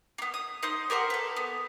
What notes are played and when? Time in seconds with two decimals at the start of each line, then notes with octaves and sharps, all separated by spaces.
0.18 A#3 B3
0.34 D#6
0.63 D#4 C5 D#6
0.90 G4 A#4 C5 F#5
1.10 A4 B4
1.36 B3